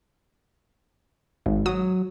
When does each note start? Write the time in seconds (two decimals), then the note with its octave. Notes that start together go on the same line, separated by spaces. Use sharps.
1.46 G#1 G#2
1.66 F#3 D#6